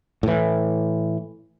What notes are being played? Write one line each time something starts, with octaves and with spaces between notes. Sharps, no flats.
A2 E3